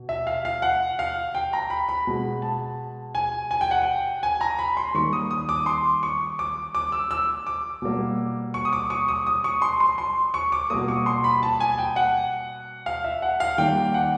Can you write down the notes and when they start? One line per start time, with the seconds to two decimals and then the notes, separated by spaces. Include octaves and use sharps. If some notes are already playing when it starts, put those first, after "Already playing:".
Already playing: B2
0.09 E5
0.27 F5
0.45 F5
0.62 F#5
0.99 F5
1.35 G5
1.53 A#5
1.70 B5
1.89 B5
2.07 B2 G#3
2.42 A5
3.15 G#5
3.51 G#5
3.61 G5
3.71 F#5
3.82 G5
4.23 G#5
4.41 A#5
4.59 B5
4.77 C6
4.94 D#3 G3 A#3 C#6
5.13 D#6
5.31 D#6
5.49 D6
5.66 C6
6.03 C#6
6.39 D6
6.75 D6
6.92 E6
7.11 E6
7.47 D6
7.82 B2 G3 A#3
8.54 C#6
8.65 D#6
8.73 D6
8.90 C#6
9.08 D#6
9.27 D#6
9.44 C#6
9.62 C6
9.80 C6
9.98 C6
10.34 C#6
10.52 D6
10.70 B2 G3 A#3 D#6
10.88 C#6
11.06 C6
11.24 B5
11.43 A5
11.60 G#5
11.78 G5
11.96 F#5
12.86 F5
13.04 E5
13.22 F#5
13.40 F5
13.58 D#3 G3 A#3 G5
13.94 F#5